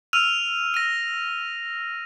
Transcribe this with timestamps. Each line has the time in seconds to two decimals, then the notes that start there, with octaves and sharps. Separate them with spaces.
0.13 E6 F6 D#7 F7
0.74 A#6 D#7